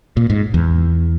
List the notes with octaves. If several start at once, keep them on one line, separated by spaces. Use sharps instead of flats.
A#2
G#2
E2